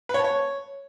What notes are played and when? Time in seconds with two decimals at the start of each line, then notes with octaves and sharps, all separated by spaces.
0.09 B4
0.14 C#5
0.19 A5
0.24 C#5